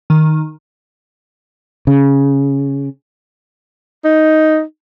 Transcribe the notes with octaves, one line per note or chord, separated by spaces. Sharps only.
D#3
C#3
D#4